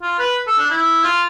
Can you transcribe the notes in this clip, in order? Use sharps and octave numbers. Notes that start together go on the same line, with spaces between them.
F4
B4
A4
D4
E4
F4